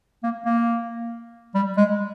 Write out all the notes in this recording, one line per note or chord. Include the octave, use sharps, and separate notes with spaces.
A#3
A#3
G3
G#3